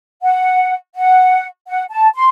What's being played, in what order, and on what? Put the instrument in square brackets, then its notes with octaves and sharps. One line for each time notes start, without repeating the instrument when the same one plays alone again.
[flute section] F#5
F#5
F#5
A5
C6